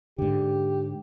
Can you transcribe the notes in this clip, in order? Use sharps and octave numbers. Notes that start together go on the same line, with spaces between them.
G#2 D3 G4